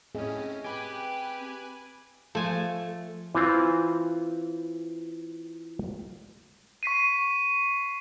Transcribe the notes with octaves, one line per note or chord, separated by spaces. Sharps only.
A2 C4 C#4 G#4 D#5
G4 B4 G#5
F3 A3 G#5
E3 C4 F4
C#6 B6 C7 D#7